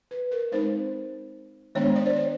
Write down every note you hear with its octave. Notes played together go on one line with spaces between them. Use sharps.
B4
A#4
G#3 C4 D#4 C5
D#3 G#3 B3 D4 C#5
D5
C5
C#5